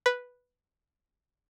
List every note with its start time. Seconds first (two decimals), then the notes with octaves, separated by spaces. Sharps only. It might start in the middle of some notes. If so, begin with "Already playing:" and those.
0.06 B4